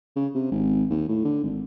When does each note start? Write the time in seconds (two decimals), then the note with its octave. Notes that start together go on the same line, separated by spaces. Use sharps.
0.16 C#3
0.35 C3
0.52 G#1
0.90 D#2
1.09 A2
1.25 D3
1.44 G#1